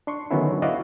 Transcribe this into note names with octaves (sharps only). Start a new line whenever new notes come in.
D4 C6 C#6
D3 D#3 F#3 B3 C#4 E4
E4 F#4 B4 D5 D#5 F5